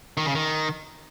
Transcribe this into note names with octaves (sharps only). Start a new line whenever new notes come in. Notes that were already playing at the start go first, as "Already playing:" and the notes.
D#3
C#3
D#3